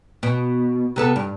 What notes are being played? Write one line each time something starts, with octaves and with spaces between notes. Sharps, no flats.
B2
C3 B3 A4
G2